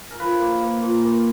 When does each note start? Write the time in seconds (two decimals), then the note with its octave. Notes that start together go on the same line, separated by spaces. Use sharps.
0.10 A#4
0.19 F3 B4
0.40 A#3
0.61 A#3
0.81 A#2
1.02 A#3